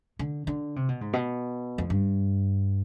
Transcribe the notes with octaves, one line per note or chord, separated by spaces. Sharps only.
D3
D3
C3
B2
G#2
B2
F2
G2